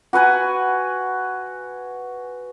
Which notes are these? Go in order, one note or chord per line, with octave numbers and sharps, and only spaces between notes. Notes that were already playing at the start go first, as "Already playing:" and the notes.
F#4 B4 F#5 G#5